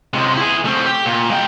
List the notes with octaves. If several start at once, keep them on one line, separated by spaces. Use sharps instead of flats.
C3 G#3
E4 G#4
A3 C4
G4
A#2
G#3 G5